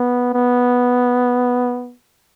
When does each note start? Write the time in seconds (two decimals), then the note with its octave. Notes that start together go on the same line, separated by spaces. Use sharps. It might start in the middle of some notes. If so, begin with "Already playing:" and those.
Already playing: B3
0.34 B3